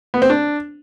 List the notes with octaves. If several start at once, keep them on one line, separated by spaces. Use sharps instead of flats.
B3
C4
D4